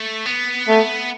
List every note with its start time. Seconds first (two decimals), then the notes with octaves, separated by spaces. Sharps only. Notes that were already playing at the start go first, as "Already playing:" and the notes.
Already playing: A3
0.26 B3
0.68 A3